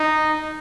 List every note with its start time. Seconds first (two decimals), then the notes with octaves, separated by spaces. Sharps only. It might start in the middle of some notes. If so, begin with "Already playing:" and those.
Already playing: D#4